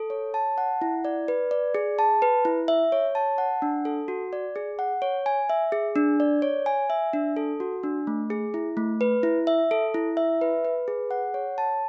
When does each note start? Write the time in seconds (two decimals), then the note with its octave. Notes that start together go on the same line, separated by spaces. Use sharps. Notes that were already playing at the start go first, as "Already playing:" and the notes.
Already playing: A4
0.10 C#5
0.34 A5
0.58 F#5
0.82 E4
1.05 D5
1.28 B4
1.51 D5
1.75 G#4
1.99 A5
2.22 B4
2.45 E4
2.68 E5
2.92 C#5
3.15 A5
3.38 F#5
3.62 D4
3.85 A4
4.08 F#4
4.33 D5
4.56 G#4
4.79 F#5
5.02 C#5
5.26 G#5
5.50 E5
5.72 G#4
5.96 D4
6.20 D5
6.42 C#5
6.66 G#5
6.90 E5
7.13 D4
7.36 A4
7.60 F#4
7.83 D4
8.07 A3
8.30 G#4
8.54 E4
8.77 A3
9.01 B4
9.23 E4
9.47 E5
9.71 A4
9.94 E4
10.17 E5
10.41 B4
10.65 B4
10.88 G#4
11.11 F#5
11.34 C#5
11.58 A5